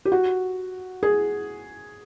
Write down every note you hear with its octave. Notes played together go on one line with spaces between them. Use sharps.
G4
F#4
G#4